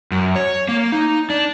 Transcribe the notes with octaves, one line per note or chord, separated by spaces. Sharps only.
F#2
C#5
A#3
D#4
D4